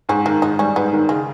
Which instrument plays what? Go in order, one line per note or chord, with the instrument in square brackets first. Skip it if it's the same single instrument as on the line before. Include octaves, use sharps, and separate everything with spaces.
[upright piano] G#2 [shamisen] C#4
[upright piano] D#3 [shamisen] A#3
[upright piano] G#2 [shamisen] D#4
[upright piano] G3 [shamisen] C#4
[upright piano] G#2 [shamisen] B3
[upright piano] D#3
[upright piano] C#3 [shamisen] G#3